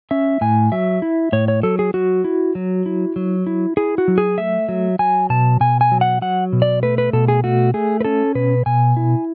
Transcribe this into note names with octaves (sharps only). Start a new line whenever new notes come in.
C#4 E5
A2 G#5
F#3 E5
E4
A2 C#5
C#5
F#3 A4
G#4
F#3 F#4
E4
F#3
E4
F#3
E4
E4 G#4
F#4
F#3
G#4
A3 E5
F#3
F#3 G#5
B2 A5
B2 G#5
G#5
F#3
F#5
F#3 F#5
B2
D5
A3 B4
B4
B2 A4
G#4
A3 F#4
A3 G#4
B4
C#4 A4
B2 B4
B2 G#5
E4